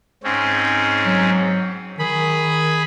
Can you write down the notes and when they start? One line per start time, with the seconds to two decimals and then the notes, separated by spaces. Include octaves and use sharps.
0.24 G#2 C4 C#4
1.06 F#3
1.99 D#3 G#4 B5